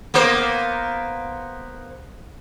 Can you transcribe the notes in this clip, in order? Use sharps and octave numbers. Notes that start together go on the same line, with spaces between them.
A#3 B3 C5